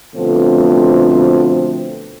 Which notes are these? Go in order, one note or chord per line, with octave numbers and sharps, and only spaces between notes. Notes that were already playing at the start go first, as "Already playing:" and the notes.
B2 D3 F3 A3 C4